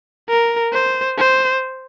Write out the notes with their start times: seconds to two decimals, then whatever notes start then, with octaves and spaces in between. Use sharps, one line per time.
0.29 A#4
0.73 C5
1.18 C5